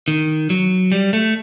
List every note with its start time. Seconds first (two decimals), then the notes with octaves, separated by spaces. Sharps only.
0.08 D#3
0.50 F#3
0.92 G3
1.13 A3